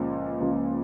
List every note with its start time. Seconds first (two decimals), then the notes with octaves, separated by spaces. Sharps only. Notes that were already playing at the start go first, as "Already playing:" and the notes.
Already playing: C#2 A#2 C#3 F3
0.40 C#2 C#3 F3